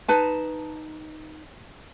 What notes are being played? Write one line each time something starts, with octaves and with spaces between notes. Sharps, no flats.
D#4 B4 A5